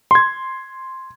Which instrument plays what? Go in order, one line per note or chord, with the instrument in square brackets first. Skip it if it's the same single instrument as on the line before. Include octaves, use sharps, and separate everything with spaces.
[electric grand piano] C6 G#6